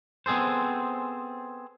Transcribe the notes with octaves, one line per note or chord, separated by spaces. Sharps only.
B3 C4 G#4 A4 C5